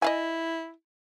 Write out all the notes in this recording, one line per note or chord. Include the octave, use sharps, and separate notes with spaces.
E4 D#5 F5 G#5